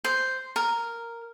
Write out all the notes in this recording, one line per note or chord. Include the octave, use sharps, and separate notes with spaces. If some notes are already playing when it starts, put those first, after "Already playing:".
C5
A#4